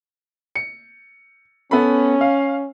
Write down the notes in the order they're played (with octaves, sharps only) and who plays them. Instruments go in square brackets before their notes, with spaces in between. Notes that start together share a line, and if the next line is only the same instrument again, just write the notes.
[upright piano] C#7
[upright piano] B3 A4 B5 [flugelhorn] C#4
[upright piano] F5